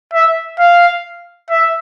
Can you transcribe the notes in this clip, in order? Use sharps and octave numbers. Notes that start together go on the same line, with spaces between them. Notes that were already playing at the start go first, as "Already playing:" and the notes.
E5
F5
E5